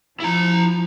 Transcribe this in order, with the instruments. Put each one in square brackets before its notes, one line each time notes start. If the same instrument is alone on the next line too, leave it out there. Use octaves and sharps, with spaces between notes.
[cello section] F3 [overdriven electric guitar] E4 A#5